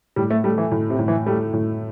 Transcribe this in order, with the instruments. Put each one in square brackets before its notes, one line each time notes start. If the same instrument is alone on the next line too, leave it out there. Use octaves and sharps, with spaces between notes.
[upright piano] A2 [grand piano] G3
[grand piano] A3
[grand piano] G3 [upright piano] A3
[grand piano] E3
[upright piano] A2
[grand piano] C3
[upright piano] A2
[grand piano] E3
[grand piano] G3 [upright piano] A3
[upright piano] A2